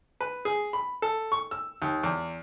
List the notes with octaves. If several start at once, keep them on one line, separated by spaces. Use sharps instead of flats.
B4
G#4
B5
A4
C#6
E6
D#2
E2